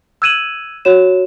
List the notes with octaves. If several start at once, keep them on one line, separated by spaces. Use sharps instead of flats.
E6 F#6 G#6 D#7 E7 F#7
F#4 C#5 E7